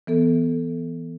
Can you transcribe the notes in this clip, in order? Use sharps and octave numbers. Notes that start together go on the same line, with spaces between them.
E3 B3 A4